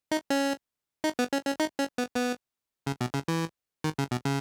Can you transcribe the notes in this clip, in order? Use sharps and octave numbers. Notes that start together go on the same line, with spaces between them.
D#4
C#4
D#4
B3
C#4
C#4
D#4
C#4
B3
B3
C#3
B2
C#3
E3
D#3
C#3
B2
C#3